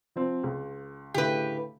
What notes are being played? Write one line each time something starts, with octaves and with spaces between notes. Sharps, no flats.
F3 C4
C#2
D2 A2 C#3 G4 B4